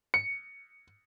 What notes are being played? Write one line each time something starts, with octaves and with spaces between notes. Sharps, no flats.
C#7